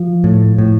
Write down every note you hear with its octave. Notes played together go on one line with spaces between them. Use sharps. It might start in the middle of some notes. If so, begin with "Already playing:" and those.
Already playing: F3
A2
A2